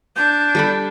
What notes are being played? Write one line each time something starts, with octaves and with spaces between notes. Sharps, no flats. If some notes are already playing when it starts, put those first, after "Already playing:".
D4 G6
G3 A4 B5